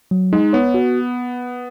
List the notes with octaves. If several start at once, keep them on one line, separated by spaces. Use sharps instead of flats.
F#3
G#3 D#4
B3 C#5
F#4